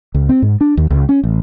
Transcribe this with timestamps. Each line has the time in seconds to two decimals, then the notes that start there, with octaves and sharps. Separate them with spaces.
0.14 C#2
0.29 C4
0.42 G#2
0.61 D4
0.77 D#2
0.90 C#2
1.09 C#4
1.24 A1